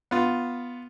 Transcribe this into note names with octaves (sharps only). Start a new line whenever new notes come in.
B3 F4